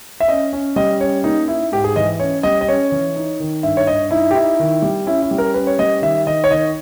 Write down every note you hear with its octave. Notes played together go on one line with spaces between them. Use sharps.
E5
C#4 D#5
C#4
G3 D#5
C#4 C#5
A#3 D#4
D#4 E4
G#2 G4
G#4
E3 D#5
C#4 C#5
G3 D#5
D#5
C#4 C#5
E3
D#4
D#3
G2 E5
C#5
G2 D#5
D#4 E4
G4
D#4 E4
D#3
G3
C#4 E4
E4
G3
A#4
C#4 B4
C#5
G3 D#5
D#3 E5
D#3 D#5
C#5
D#3 D#5